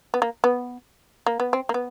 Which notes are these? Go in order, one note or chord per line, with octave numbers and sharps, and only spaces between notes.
B3
A#3
B3
A#3
B3
C4
A#3
B3